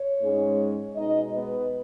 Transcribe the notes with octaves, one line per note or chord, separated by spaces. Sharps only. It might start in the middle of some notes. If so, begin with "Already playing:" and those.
Already playing: C#5
G#2 G#3 C#4
B2 G#3 B3 D#4 D#5
B3 B4